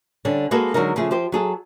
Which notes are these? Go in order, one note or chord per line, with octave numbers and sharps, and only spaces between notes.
D3 G3 C#4
G#3 A#3 F#4 G#4 A4 B4
D3 F#3 G#3 D#4 A#4
C#3 F3 A3 G#4
F3 G4 C5
F#3 G#4 A4